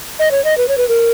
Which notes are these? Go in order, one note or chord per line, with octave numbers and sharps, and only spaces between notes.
D#5
C#5
D#5
B4
C#5
B4
A#4